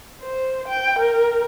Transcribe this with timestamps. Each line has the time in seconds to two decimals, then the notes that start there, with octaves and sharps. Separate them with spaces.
0.22 C5
0.68 G5
0.99 A#4